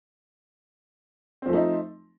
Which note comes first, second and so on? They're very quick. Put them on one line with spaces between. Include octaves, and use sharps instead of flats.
C4 F3 A3 D#4